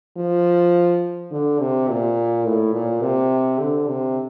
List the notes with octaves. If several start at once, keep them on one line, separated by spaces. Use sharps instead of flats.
F3
D3
C3
A#2
A2
A#2
C3
D3
C3